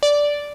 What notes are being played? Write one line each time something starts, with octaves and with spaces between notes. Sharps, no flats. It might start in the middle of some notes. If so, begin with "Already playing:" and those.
D5